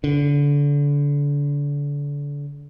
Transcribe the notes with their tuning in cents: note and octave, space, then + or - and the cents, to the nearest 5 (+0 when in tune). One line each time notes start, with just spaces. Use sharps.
D3 -30